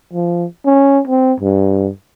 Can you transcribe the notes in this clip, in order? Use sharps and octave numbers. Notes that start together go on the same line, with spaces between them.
F3
C#4
C4
G2